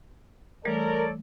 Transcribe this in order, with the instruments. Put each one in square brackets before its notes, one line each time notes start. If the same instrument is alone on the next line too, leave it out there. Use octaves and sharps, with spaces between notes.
[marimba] E3 G3 A3 [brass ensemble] A4 C#5 D5 [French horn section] A#4